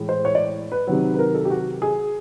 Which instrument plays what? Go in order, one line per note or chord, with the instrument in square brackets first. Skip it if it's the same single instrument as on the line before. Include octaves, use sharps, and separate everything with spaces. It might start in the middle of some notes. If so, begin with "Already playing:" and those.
Already playing: [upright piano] A2 E3 G#3
C5
C#5
D5
B4
C3 D#3 F#3
B4
A#4
A4
G4
F#4
G#4